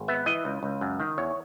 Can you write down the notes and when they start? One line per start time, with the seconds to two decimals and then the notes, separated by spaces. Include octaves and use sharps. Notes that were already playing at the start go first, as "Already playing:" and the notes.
Already playing: G#1
0.08 B3 E5
0.26 E3 D#5
0.45 C#2
0.63 C#2
0.81 F#2
1.00 D#3
1.18 E2 C#5